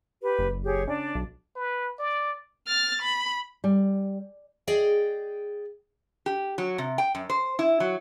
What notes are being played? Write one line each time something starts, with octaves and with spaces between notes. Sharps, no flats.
G4 B4
F#1
G4 G#4 C#5
C#3 D4 D5
B1
B4
D5
F6 A6
B5
G3
G#4 D5 D#5 G5
G4
F#3
C3
G5
F#2
C5
E4
F#3